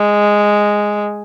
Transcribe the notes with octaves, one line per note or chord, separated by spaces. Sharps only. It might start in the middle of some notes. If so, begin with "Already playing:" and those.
Already playing: G#3